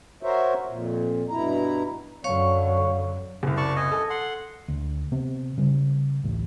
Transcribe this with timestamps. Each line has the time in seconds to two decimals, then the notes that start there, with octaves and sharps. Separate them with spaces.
0.23 F#4 A#4 C5 C#5 E5
0.67 F2 A#2
1.30 G2 B2 E4 A#5
2.24 F#2 D3 C#5 F5 C#6
3.43 F#1 C2
3.57 D5 A5 C#6
3.76 D#5 G#5
3.91 A4
4.10 F#5 C6
4.68 D2
5.12 C3 B3 C4
5.58 C#3 G3
6.24 A1 D2